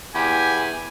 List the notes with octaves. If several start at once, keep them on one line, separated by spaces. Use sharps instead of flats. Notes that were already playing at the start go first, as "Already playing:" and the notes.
E2 G4 G#5